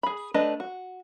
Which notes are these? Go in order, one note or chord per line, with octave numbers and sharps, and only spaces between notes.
G#4 B5
A3 D4 G4 B4 D#5
F#4